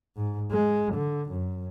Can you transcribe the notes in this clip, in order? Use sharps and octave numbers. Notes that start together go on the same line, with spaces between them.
G#2
G#3
D3
F#2